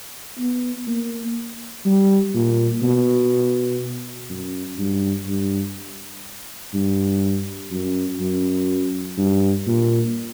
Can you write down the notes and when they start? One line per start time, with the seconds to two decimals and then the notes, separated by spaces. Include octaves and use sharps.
0.39 B3
0.87 A#3
1.85 G3
2.34 A#2
2.83 B2
4.29 F#2
4.78 G2
5.27 G2
6.73 G2
7.71 F#2
8.20 F#2
9.18 G2
9.66 A#2